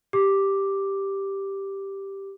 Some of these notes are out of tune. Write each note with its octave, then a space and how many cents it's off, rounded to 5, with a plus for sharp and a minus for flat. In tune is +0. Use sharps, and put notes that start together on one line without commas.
G4 +0 D6 +0